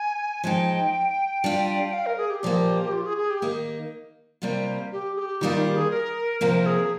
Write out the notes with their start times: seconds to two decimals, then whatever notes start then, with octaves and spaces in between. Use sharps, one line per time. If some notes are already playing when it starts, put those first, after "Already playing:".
Already playing: G#5
0.44 F3 G#3 D#4 G5 G#5
1.44 G3 D4 F4
1.93 F5
2.06 A#4
2.17 G#4
2.30 G4
2.43 A#2 F3 A#3
2.93 F4
3.05 G#4
3.18 G#4
3.30 G4
3.42 D#3 A#3 D#4
4.42 C3 G3 A#3 F4
4.92 G4
5.16 G#4
5.20 G4
5.41 D#3 G3 A#3 D#4 F4
5.57 G4
5.75 G#4
5.91 A#4
6.41 C3 F3 A#3 A#4
6.66 G#4